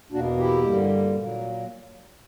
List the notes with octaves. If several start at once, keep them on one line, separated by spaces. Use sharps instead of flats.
E2 B2 A#3 D4 F#4
E4 G4
G2 D3 G3 A#3
A#2 F#3 A#3